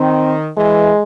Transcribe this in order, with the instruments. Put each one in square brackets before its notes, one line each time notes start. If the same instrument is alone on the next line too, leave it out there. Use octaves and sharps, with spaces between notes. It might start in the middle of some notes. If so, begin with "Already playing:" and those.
Already playing: [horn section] D#3 [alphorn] C4
[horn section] E3 [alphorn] G#3